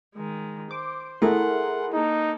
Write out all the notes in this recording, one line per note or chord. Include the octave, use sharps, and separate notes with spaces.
D#3 G#3
C5 D6
A3 E4 G#4 A#4 F#5 C6
A#3 D#4 A4